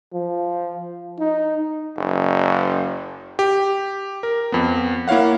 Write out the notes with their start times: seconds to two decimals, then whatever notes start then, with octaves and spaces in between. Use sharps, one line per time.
0.13 F3
1.19 D#4
1.97 F#1
3.39 G4
4.23 A#4
4.52 F2 B3
5.08 A#3 E4 C#5 F5 F#5